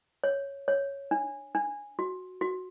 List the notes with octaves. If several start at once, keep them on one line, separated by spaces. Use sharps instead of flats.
C#5
C#5
D4
D4
F#4
F#4